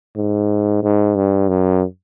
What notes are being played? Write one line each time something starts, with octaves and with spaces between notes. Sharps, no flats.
G#2
G#2
G2
F#2